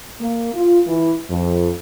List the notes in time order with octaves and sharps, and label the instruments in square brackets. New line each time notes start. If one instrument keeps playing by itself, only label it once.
[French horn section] A#3
F4
E3
F2